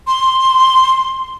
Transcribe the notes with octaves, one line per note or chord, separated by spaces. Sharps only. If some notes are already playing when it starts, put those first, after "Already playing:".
C6